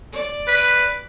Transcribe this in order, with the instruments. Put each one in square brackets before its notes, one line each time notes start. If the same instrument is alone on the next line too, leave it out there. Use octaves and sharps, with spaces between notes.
[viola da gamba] D5
[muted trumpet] B4